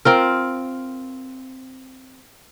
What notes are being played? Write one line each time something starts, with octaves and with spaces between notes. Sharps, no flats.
C4 F4 A#4